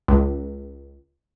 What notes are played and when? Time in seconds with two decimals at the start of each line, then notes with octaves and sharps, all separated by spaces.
0.08 C#2